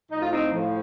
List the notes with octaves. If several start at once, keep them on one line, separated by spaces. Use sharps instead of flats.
A2 F3 D#4
F4
C4 D#4
A2 F3